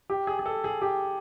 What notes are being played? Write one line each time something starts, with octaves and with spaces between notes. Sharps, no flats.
G4
G#4
G#4
A4
G#4
G4